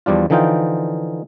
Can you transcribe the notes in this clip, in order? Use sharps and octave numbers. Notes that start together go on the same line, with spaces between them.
E2 F3 G3 D4 F4
D3 E3 F3 D#4 F4 G5